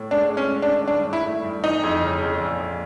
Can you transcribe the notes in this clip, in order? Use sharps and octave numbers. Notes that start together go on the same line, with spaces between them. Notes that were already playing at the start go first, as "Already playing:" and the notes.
Already playing: A2
G#3 D4
G#3
C#4
C#4
D4
D#3
G2 D4
A3
E4
A3
G2
E3 D#4
F2
C#3
F2
A#1
A#1